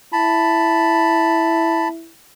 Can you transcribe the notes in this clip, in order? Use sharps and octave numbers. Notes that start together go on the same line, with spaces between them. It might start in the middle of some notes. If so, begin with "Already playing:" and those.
E4 A5 B5